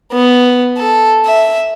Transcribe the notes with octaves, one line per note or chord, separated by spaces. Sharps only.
B3
A4
E5